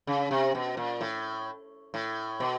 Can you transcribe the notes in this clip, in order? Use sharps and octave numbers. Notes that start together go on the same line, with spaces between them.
C#3
C3
B2
A#2
A2
A2
B2